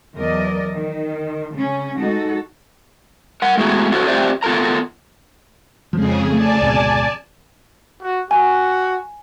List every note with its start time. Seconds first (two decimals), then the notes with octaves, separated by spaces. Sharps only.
0.16 E2 F#3 A#4 D5 D#5
0.75 D#3
1.53 C#3 C#4
1.98 G#3 D#4 F#4 A4
3.42 A#4 F#5
3.57 G#3 A3 B3 E4 F#4 G#4
3.92 E4 F#4 A4 C5 C#5
4.06 C4 F4 G4 C5 D5 E5
4.43 B3 F4 A4 A#4 A#5
5.93 F2 C#3 F3 G#3 G#4
6.32 A3 D5 G#5 A5
6.61 D2 G#2 B2
8.02 F#4
8.31 F#4 G#5